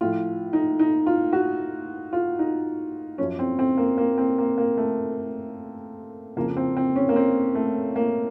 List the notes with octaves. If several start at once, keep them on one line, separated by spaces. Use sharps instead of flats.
A2 F3 F4
D#4
D#4
F4
F#4
F4
D#4
F#2 F3 C#4
C4
C4
A#3
A#3
C4
A#3
A#3
A3
F2 C#3 F3 A#3
C4
C4
C#4
A#3
C4
A3
A#3